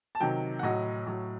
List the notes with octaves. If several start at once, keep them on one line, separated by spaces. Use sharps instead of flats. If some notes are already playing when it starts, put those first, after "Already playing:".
A5
C3 D#3 F#3 G5
F#5
A2 F#3 D#5
A2 F#3